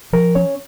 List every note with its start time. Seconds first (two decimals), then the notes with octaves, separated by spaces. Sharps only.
0.13 F3 A#4
0.35 C#4 C#5